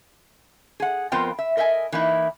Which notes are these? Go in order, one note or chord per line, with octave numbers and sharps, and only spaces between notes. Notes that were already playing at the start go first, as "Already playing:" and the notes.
G#4 F#5
F2 B3 F4 A#4 C5 G5
E5
A#4 D#5 E5 F#5 G#5
E3 A#3 D#4 E4